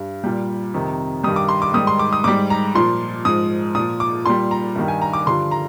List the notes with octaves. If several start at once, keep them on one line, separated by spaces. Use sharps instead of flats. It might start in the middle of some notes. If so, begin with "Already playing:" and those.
Already playing: G2
A#2 G3
F2 C3 D#3
G2 D#3 G3 D#6
D6
C6
D6
G#2 D#3 G3 D#6
C6
D6
D#6
G#2 G3 D6
A#5
A#2 F3 C6
G#2 F3 D#6
A#2 F3 D#6
D6
A#2 G3 C6
A#5
G2 D#3 G3
G#5
A#5
D6
G2 D3 F3 C6
A#5